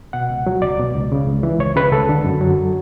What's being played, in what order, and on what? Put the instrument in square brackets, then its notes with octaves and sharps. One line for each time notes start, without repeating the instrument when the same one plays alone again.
[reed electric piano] B2 F#5
C#2
F#3
C#2 D5
B2
C#2
C#3
C#2
E3
C#2 C#5
C#3 B4
C#2 A4
D3
F#2
F#3